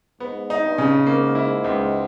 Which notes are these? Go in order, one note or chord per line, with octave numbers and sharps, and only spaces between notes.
G#2 B3
D#4
G2
C#3
G#2 A#3
E4
C#2